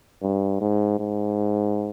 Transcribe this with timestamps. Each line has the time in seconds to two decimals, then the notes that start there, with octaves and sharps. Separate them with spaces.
0.23 G2
0.61 G#2
0.99 G#2